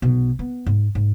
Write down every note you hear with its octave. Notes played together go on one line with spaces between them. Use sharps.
B1 B2
B3
G#2
G#2